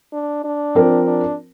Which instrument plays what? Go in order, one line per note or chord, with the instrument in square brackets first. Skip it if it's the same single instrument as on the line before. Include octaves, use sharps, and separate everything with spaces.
[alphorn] D4
D4
[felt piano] F3 C4 A#4
[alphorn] D4